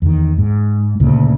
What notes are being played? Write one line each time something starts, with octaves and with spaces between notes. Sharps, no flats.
E2 D#3
G#2
D2 A#2 C#3